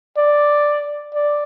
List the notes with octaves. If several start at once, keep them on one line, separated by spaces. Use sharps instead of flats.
D5
D5